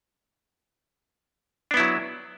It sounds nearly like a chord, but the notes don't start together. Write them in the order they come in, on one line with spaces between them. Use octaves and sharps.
D4 B3 E4 F#3